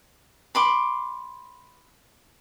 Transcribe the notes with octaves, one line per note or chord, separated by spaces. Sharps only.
B5 C6 D6